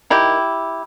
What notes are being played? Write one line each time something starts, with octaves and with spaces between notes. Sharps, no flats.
D#3 E4 G4